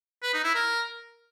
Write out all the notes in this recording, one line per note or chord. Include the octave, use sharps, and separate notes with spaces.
B4
D#4
E4
A#4